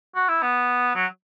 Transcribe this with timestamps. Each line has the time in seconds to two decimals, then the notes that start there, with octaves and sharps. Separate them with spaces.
0.15 F#4
0.29 E4
0.42 B3
0.95 F#3